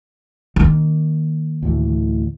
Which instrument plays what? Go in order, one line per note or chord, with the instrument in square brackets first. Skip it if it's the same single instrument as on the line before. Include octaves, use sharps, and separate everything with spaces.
[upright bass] D#3 A#3
[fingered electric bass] D2 A2 E3